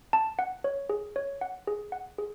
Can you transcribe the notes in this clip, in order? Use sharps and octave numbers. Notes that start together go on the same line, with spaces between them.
A5
F#5
C#5
G#4
C#5
F#5
G#4
F#5
G#4